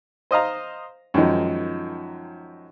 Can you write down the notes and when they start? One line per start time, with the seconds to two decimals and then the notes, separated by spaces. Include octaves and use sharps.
0.31 C5 D#5 F5 A#5
1.14 F#2 D#3 F3 G#3